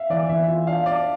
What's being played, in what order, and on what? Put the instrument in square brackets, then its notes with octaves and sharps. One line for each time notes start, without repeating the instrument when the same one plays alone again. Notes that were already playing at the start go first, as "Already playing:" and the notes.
Already playing: [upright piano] E5 F5
[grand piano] E3 [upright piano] D5
[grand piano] E3 [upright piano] E5
[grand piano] F4
[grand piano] D4 [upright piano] F5
[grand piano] D4 [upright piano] D5